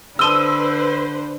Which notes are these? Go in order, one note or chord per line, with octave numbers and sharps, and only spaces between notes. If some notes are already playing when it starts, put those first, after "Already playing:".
D3 B4 C5 A5 C6 D#6 E6 D#7